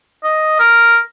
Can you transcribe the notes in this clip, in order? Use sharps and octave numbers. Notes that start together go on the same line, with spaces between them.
D#5
A#4